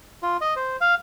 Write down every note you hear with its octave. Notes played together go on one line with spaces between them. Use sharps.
F4
D#5
C5
F5